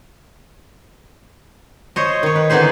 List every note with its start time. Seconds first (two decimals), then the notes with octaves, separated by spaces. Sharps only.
1.96 C5 C#5 D#5
2.23 D#3 C#5
2.36 B4
2.50 D3 E3 B3 D#4 G#4 C5